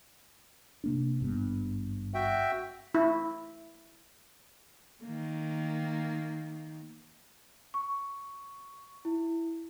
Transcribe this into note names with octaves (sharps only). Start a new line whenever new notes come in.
C3 A#3 D4
G#1 G2 B3
F#4 E5 G5
E4
D#3 A#3
C#6
E4